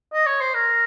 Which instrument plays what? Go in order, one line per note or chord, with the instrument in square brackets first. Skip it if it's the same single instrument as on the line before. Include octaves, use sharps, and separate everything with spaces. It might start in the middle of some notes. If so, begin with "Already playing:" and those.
[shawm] D#5
C#5
C5
A#4